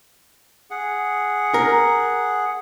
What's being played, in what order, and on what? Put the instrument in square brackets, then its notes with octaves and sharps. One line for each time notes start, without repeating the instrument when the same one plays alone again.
[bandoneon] G#4 F#5
[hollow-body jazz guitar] A#4